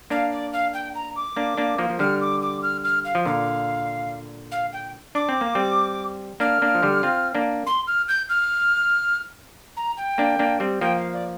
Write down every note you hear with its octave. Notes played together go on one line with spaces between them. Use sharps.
A#3 D4 F5
D5
F5
G5
A#5
D6
A#3 D4
A#3 D4
F3 A#3
F3
D3 G3 F6
D6
D6
F6
F6
F5
F3
A#2 D3 F5
F5
G5
D4 D6
C4
A#3
G3 C4
A#3 D4 F6
A#3 D4
F3
D3 G3
C4 F4
A#3 D4
C6
F6
G6
F6
A#5
G5
A#3 D4
A#3 D4
G3 C4
F3 A#3 G5
F5
D5